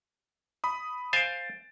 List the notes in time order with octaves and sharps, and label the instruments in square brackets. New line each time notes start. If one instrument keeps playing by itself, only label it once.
[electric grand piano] B5 D#6
[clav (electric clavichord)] C5 F5 G#5 [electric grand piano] A6 D7